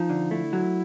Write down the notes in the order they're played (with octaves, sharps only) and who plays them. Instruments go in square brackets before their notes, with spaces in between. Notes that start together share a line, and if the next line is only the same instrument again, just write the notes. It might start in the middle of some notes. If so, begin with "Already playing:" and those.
Already playing: [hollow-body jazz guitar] F3 [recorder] D#4
[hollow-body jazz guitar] D3
[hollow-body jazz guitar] A3 [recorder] E4
[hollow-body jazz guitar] F#3